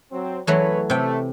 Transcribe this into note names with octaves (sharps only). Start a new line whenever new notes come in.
F#3 C4
F#1 E3 F#3 A3 B4 C#5
C3 A3 G5